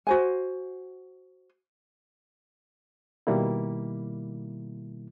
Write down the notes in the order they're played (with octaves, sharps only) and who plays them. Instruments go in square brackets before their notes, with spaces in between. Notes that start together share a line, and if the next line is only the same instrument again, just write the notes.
[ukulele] F#4 C5 G#5
[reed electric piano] B2 D#3 G3 A#3 E4